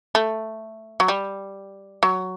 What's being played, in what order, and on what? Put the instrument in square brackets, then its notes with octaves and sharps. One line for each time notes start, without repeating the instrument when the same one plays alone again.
[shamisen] A3
F#3
G3
F#3